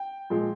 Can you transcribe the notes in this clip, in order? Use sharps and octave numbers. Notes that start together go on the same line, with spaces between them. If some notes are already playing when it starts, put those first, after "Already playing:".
Already playing: G5
A#2 F3 G#3